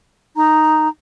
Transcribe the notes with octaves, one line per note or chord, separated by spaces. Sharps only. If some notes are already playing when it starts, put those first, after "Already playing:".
D#4 A#5